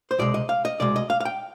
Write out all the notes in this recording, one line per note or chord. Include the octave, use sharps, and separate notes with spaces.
C5
C2 B2 G#3 D5
D#5
F5
D#5
C2 B2 G#3 D5
D#5
F5
F5
G5